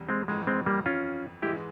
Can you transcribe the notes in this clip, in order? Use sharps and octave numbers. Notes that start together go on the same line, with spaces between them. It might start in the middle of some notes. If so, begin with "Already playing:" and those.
Already playing: E1 E2 C3 E3 G3
G#3 C4
G1 F2 E3 G#3
G#3 C4
G3 A#3
C#4 F4
G#2 E3 G#3 E4 G4